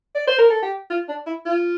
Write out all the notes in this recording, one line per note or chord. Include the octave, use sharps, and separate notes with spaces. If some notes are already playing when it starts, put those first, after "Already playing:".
D5
C5
A#4
A4
G4
F4
D4
E4
F4